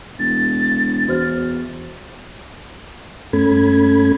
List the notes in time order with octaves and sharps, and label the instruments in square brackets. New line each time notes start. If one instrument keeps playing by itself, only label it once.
[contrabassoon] E1 [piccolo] A6
[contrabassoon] E2 [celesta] F#4 C5 F6
[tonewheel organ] G2 A3 C#4 A4 B5 G#6